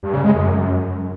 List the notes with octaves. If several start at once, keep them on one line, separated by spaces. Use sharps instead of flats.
G2
C#3
G#3
F#2